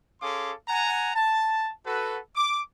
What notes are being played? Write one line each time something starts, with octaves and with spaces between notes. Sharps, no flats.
C#4 G#4 A4 F5 C6 D6
F#5 G#5 A#5
A5
F#4 A4 B4
D6